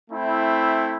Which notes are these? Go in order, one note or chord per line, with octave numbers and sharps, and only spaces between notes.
A3 C4 E4